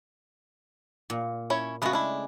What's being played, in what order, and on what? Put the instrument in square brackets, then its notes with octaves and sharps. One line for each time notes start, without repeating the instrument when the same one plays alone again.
[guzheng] A#2
[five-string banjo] C#4 E4 C#5
[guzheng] C#3 G#3 A3 [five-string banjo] B3 F#4
[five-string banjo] D4 E4